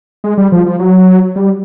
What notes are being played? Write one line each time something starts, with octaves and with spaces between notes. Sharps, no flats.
G#3
G3
F3
F3
F#3
G3